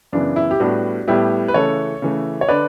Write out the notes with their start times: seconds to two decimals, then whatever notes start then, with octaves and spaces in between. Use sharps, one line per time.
0.12 F#2 C#3 E3 B3 D4
0.36 E4
0.51 G4
0.60 A2 G3 B3 D4 F#4
1.08 A2 G3 B3 E4 G4
1.48 B4
1.54 C#3 E3 A3 A4 C#5
2.02 C#3 E3 A3
2.41 C#5
2.49 D3 B4 D5